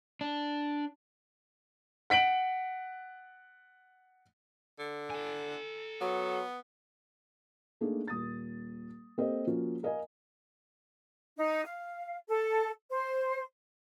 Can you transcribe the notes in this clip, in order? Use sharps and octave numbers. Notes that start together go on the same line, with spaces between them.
D4
F#5 B6 D7 F#7
D3
A4 G#5
F#3 B3
A3 A#3 D4 D#4 G#4
D#1 D#6 A6
A#3 C4 G4 A4 C5 D#5
F3 A#3 C#4 F4 F#4
A#4 D#5 F5 G#5
D#4
F5
A4
C5